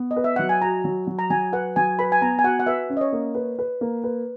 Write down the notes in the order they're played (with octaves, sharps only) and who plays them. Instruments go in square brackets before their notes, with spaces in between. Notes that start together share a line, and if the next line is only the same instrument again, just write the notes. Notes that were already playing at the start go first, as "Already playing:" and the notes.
Already playing: [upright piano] B3
[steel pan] D#5
[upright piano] B4
[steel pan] E5
[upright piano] F#3 [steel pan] F#5
[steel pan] G#5
[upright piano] F#4 [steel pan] A#5
[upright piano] F#3
F#3
[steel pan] A#5
[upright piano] F#3 [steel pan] G#5
[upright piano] B4 [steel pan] F#5
[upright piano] F#3 [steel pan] G#5
[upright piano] B4 [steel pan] B5
[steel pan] G#5
[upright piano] B3 [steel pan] A#5
[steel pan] G#5
[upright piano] F#4 [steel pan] F#5
[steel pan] F#5
[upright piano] B4 [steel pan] E5
[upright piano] C#4
[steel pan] D#5
C#5
[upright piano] A#3
B4
B4
A#3
B4